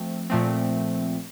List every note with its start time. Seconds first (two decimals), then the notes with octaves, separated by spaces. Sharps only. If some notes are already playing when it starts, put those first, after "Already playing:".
Already playing: F3 A3 C4
0.30 A#2 F3 A3 C4